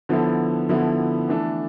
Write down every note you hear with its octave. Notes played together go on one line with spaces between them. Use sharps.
D3 F3 B3 E4 A4
D3 F3 B3 E4 A4
E3 A3 D4 A4